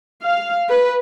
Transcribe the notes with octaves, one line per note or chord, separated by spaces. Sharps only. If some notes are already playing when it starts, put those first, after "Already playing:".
F5
B4